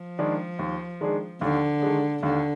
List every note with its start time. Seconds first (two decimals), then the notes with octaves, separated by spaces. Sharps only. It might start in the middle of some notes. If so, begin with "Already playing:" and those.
Already playing: F3
0.19 D#3 G#3 D4 G#4
0.59 D#2
1.01 D#3 G#3 D4 G#4
1.41 D#2 D3
1.82 D#3 G#3 D4 G#4
2.23 D#2 D3